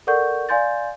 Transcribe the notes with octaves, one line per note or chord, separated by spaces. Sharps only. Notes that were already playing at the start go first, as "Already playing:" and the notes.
A4 A#4 D5 F#5 C#6 G6
D5 F5 G#5 C6 G6 A6